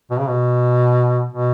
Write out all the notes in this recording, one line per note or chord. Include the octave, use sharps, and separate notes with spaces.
B2
C#3
B2
B2